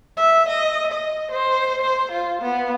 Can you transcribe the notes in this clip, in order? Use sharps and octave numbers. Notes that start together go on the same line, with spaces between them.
E5
D#5
D#5
C5
C5
F4
B3